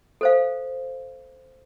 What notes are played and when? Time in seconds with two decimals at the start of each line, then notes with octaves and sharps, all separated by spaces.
0.21 A4 C5 F5